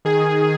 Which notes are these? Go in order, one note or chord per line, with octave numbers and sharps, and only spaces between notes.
D#3 G#4
D#3
D#3